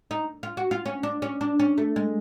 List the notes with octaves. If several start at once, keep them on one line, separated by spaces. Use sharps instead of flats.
D#4
F4
F#4
F4
C#4
D4
C#4
D4
C#4
A3
G#3